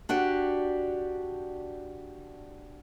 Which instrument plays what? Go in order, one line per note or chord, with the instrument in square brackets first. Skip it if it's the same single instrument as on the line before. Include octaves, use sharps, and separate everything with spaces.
[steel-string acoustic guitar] D4 F#4 G4 D5